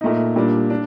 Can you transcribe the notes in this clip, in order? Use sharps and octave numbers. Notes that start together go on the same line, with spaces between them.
A#2 A3 D#4
A#2 G3 D4
D4